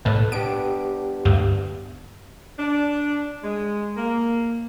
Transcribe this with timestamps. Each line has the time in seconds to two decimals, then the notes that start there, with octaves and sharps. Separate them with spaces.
0.05 B1 A2 B4 A5
0.32 B3 D4 G4 D7
1.25 D2 G2
2.59 D4
3.44 G#3
3.97 A#3